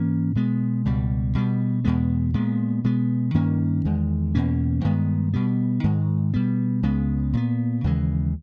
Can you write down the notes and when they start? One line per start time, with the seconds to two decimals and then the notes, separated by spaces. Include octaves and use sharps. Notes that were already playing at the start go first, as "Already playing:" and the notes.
Already playing: G#2 E3 A#3 C#4
0.35 B2 G#3 B3
0.85 C#2 B2 G3
1.35 B2 G3 B3
1.84 E2 B2 G#3 B3
2.34 A#2 G#3 B3
2.84 B2 G#3 B3
3.34 G2 D#3 A#3 C#4
3.85 E2 D#3 G#3
4.35 E2 B2 A#3 C#4
4.84 G2 D#3 G#3 B3
5.33 B2 G3 B3
5.84 G#2 D#3 G#3
6.34 B2 G3 B3
6.83 C#2 C#3 G#3 B3
7.33 A#2 G#3 B3
7.84 D#2 C#3 E3 G#3